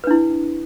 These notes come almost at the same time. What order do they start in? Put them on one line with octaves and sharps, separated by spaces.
B4 D4 E4